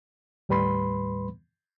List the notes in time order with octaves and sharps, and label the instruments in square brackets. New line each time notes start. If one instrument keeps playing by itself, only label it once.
[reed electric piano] D#2 A2 G3 B4 B5 C6